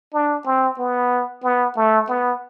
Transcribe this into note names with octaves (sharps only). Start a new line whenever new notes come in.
D4
C4
B3
B3
A3
B3